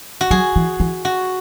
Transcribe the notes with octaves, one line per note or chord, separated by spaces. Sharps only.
F#4
F#3 G#4
E3
E3
F#4